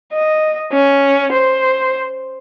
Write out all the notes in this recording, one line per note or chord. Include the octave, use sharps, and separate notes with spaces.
D#5
C#4
C5